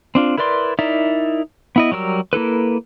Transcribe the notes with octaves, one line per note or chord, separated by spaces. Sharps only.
C4 D4 F4
E4 A#4 B4 D5 C6
D#4 E4 A#4 D5 E5
B3 E4 D#5
F#3 G3 A#4 E6
A#3 E4 A4 B4